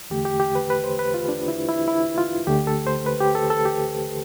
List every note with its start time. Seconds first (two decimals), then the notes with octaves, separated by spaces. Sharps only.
0.10 E2 D3 A3 G4
0.25 G4
0.40 G4
0.55 B4
0.70 B4
0.84 C5
0.99 B4
1.14 F4
1.29 D4
1.48 E4
1.69 E4
1.88 E4
2.18 F4
2.47 D2 D3 A3 G4
2.67 A4
2.87 C5
3.06 B4
3.20 G4
3.35 A4
3.50 A4
3.65 G4